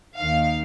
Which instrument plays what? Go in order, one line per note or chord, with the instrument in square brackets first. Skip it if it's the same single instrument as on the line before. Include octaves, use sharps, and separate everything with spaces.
[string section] D#2 D#3 F5